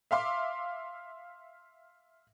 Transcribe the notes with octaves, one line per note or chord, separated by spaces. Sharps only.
E5 F5 C6 D6